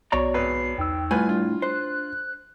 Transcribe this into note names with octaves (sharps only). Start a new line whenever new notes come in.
B1 B3 F#4 C#5 D5 A#5 C#6
G#1 B4 C7
E2 D#4 G5 E6
A2 G3 F4 B4 G#5
D4 F4
C5 F#6